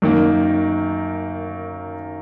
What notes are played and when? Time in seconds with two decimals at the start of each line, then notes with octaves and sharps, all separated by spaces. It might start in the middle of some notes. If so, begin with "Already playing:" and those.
0.02 F#2 D#3 A#3